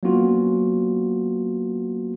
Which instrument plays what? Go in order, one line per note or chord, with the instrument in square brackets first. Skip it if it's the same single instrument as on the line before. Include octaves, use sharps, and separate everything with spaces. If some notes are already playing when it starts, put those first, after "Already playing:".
[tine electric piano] F#3 A#3 B3 C#4 F4 F#4